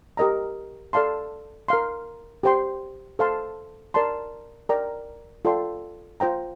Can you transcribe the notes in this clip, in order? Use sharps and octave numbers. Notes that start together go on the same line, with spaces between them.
G4 A#4 D#5 A#5
A4 D5 F5 A5 C6
A#4 F5 C6
G4 C5 G5 C6
A4 C5 F5 A5 C6
A#4 D5 A5 C6
A#4 D5 G5 A#5
F4 A4 D5 G5 C6
F4 C5 G5 A#5